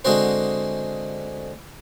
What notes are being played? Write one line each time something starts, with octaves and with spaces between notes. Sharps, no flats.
D3 G#3 C4 F#4 C5